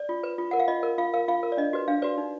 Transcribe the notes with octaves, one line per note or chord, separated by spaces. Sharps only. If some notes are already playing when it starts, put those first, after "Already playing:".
Already playing: D5
F4
B4
F4
A#4 F#5
F5
F4 D#5
A#4
F4 F5
A#4 F5
F4 F5
A#4
D5
D4 D#5
F#4 B4
D4 F5
F#4 B4 D5
D#4